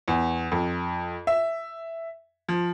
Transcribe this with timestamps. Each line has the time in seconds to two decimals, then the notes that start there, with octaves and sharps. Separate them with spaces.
0.08 E2
0.52 F2
1.27 E5
2.49 F3